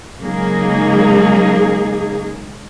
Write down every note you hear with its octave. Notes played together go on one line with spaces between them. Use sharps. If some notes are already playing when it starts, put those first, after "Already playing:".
C#3 F#3 G#3 A#3 D#4 G#4